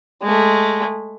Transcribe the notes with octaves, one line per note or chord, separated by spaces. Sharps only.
G#3 A3